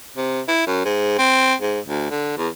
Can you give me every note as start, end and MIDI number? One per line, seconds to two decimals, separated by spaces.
0.17 0.41 48
0.48 0.63 64
0.67 0.83 42
0.85 1.14 44
1.18 1.54 60
1.61 1.80 44
1.86 2.06 38
2.11 2.34 50
2.38 2.48 40